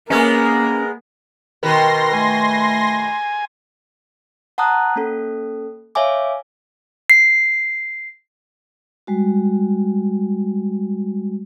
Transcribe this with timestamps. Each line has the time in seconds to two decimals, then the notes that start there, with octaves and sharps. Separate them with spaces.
0.10 G#3 A#3 B3 C#4 G#4 A#4
1.63 B2 D#3 A#4 B4 C6 A#6
2.13 A3 G#5
4.58 F#5 A5 A#5 D#6 F#6
4.96 A#3 C#4 A4
5.95 C#5 E5 F5 G#5 D6
7.10 C7
9.07 G3 G#3 F#4